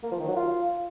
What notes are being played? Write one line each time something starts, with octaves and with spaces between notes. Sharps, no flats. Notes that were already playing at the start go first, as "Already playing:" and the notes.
A#3
F3
D#3
F#3
F4